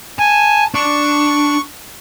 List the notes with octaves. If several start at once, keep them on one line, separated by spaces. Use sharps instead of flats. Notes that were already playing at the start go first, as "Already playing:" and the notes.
G#5 A5
D4 C#6